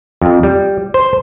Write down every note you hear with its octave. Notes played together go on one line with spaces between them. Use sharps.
F2
G3
C5